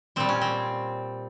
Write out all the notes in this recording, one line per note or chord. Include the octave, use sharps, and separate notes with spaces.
A#2 G3 C4
C#4
C4